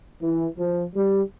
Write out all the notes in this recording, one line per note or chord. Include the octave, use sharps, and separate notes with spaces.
E3
F3
G3